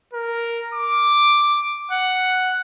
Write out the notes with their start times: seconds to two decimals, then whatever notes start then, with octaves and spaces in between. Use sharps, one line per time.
0.13 A#4
0.74 D6
1.92 F#5